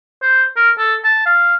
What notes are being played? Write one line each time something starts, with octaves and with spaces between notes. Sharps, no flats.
C5
A#4
A4
A5
F5